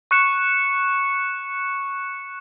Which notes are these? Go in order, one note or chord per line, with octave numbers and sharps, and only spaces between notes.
C#6 F#6 C#7 E7